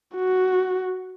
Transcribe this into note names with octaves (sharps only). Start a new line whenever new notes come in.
F#4